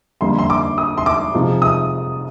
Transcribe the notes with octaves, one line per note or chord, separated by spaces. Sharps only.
F2 D3 G3 A#3 C6
C6
D6
D#6
C6
D6
C3 F3 G#3 D#4
D#6